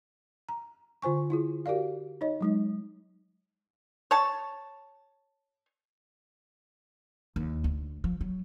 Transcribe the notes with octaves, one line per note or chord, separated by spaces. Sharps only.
A#5
D3 F4 C5 G#5 C#6
E4 F4 G#4
F#4 G4 A#4 D5 F5
D#4 C#5 D#5
F#3 G#3 D#4
C#5 A5
D#2
D2
F3
F#3